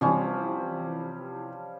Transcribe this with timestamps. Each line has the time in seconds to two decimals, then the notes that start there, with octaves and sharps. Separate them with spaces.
0.01 C3 E3 F3 G3 C#4